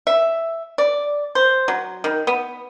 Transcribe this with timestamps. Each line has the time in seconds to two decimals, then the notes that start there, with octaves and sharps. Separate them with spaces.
0.07 E5
0.78 D5
1.35 C5
1.68 F#3
2.04 D#3
2.27 B3